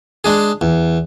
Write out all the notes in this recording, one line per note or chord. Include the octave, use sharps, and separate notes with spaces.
G#3 D4 G#4
E2